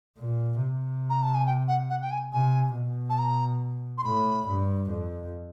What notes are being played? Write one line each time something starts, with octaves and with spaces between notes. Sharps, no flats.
A#2
C3
A#5
A5
G#5
G5
F#5
F#5
G5
G#5
C3 G#5
B2
A5
A#5
C6
A2 B5
G2
F2